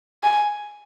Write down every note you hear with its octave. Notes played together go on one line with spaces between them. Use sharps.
G#5